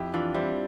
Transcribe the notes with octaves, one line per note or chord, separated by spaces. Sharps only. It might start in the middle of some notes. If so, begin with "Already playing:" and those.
Already playing: F2 E4 G4
E3 D4 F4
G3 C4 E4